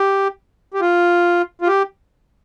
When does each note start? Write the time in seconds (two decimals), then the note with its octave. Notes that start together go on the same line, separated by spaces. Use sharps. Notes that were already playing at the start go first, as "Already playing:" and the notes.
Already playing: G4
0.74 G4
0.81 F4
1.61 F4
1.67 G4